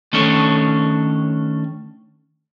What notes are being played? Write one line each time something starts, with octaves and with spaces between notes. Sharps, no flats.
D#3 A3 C#4 D4 A4 C#5